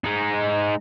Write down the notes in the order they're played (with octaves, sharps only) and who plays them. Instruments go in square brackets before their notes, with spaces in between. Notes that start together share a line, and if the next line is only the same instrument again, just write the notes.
[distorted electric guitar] G#3 D#4